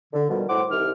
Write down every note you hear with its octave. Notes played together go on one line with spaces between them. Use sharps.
D3
B2 D#3 F3 G3
A2 C5 F#5 D6
C2 C3 D#3 F6